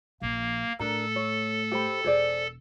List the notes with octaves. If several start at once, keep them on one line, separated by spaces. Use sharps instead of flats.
A#1 F3 A#3
A2 D4 A4 A#4 A#5
C#5
G4 C5 B5
E1 G#4 C5 D5